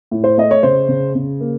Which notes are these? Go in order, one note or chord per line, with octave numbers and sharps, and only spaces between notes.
A2
C5
A3 D#5
C#5
C#3 C5
C#3
C#3
A#3